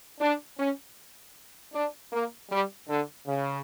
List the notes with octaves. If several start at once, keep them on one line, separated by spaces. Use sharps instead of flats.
D4
C#4
D4
A#3
G3
D3
C#3